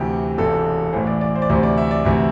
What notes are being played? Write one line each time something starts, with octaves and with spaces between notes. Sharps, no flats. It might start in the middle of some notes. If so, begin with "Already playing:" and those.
Already playing: D2 C3 E3 G4
E1 E2 C3 E3 A4
A1 A2 E3 C5
D5
D5
C5
D5
D2 C3 E3 C5
D5
E5
D5
D2 C3 E3 E5